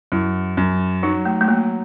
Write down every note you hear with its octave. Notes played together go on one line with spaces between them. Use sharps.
F#2 E4
F#2
F#3 D#4
A3
A3
F#3 A#3